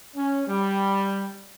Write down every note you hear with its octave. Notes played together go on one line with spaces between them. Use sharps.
C#4
G3